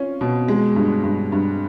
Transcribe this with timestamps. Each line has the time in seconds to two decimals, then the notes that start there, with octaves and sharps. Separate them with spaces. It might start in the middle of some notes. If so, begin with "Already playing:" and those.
Already playing: C#4 F4
0.21 B2
0.48 G#3
0.76 G2
1.04 G2
1.32 G2